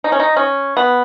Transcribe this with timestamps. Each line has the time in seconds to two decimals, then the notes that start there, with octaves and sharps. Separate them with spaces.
0.04 D#4
0.12 C#4
0.20 D#4
0.36 C#4
0.77 B3